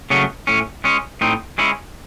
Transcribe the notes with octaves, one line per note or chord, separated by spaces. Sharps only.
C#3 F#3 A3 C#4
A2 C#4
G#3 C#4
A2 C4 D#4
G#3 C#4 E4